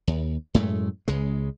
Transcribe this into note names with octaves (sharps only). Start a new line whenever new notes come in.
D#2
F#2 A2 G#3 A3
C#2 C#3 G#3